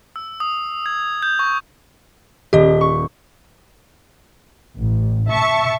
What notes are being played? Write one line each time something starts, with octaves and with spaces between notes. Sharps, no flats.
E6
D#6
G#6
G6
C#6
D#1 G4 D#5
C#6
A1
E5 A5 C#6